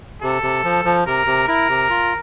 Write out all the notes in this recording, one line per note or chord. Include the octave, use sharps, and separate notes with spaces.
C3 A4
C3
F3
F3
C3 A#4
C3
E4 A#4
C3
F4